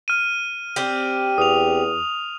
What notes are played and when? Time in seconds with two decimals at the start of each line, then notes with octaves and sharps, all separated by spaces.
0.08 F6 D#7
0.76 C4 D4 G4
1.38 E2 D#6 F7